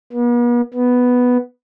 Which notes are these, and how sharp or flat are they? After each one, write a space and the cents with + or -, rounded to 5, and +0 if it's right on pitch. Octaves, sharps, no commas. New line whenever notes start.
B3 -45
B3 +0